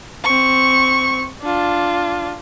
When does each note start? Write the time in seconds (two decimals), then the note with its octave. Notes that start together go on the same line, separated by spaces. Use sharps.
0.24 C4 C#6
1.42 D4 F4